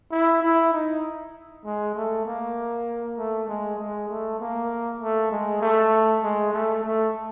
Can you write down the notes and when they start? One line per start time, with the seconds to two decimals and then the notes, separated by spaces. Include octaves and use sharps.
0.12 E4
0.42 E4
0.73 D#4
1.65 G#3
1.95 A3
2.26 A#3
3.17 A3
3.48 G#3
3.79 G#3
4.09 A3
4.40 A#3
5.00 A3
5.32 G#3
5.61 A3
6.23 G#3
6.53 A3
6.84 A3